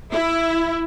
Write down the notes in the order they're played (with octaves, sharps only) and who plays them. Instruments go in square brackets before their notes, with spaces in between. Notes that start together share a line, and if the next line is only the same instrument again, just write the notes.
[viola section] E4